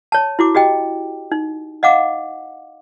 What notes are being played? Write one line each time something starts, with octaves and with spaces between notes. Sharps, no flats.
C#5 A5
E4 F#4 D6
F#4 G4 D#5 G5
D#4
D#5 F5 F#5 D6